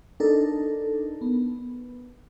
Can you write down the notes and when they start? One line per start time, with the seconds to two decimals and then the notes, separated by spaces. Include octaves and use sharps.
0.20 D4 D#4 A4 A#4
1.21 B3